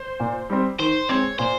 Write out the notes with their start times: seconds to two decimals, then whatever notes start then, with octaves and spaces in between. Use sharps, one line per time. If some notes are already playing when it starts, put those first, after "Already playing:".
Already playing: C5
0.20 A#2
0.50 G3 C4
0.79 D#3 C5
1.09 G#3 C4 C#5
1.39 A#2 C5